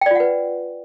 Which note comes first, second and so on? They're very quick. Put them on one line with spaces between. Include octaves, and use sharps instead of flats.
G5 D5 F4 F#5 B4